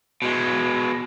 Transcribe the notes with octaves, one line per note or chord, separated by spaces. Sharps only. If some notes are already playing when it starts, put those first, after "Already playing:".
B2 G#3